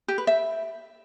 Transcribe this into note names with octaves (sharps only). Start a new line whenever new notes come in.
G4
B4
E5